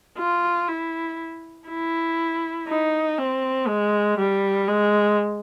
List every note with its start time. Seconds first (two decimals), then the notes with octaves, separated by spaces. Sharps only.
0.18 F4
0.68 E4
1.69 E4
2.68 D#4
3.18 C4
3.68 G#3
4.19 G3
4.68 G#3